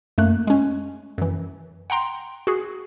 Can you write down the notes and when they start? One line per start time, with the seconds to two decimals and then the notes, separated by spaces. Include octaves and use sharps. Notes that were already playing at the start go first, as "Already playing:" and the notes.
0.18 F#2 A3 A#3 F#6
0.47 G#3 C#4
1.18 F#2 E3
1.90 F#5 G5 A#5 C6
2.47 F#4 G#4